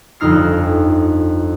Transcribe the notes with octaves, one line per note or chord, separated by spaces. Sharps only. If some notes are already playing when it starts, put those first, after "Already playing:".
G1 F2 D#4 F6 C7